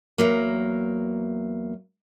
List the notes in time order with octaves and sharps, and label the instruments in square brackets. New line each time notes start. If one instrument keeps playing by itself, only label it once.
[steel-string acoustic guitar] E2 F#3 A#3